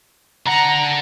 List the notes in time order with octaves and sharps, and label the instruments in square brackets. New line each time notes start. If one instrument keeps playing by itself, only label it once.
[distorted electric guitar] D3 F#5 [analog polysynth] A#5